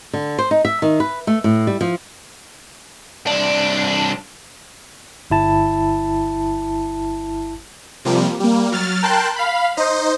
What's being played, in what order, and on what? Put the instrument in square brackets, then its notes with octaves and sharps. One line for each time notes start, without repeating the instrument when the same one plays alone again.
[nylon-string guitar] D3
C5
D#4
E5
D#3
B4
A3
A2
G3
F3
[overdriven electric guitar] C2 D4
[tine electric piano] G1 E4 A5
[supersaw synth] C3 F3 G3 A#3
G3 A#3
F#3 F6 A6
A#4 G5 A5 C6 F#6 G6
F5 B5
D#4 C5 D#5